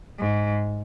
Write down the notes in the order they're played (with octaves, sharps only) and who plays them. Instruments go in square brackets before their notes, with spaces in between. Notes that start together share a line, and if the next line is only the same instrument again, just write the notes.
[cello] G#2